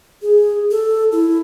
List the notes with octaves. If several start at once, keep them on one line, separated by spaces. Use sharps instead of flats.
G#4
A4
E4